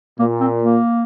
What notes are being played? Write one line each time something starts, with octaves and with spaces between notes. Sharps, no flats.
A#2 A#3
C4
A#3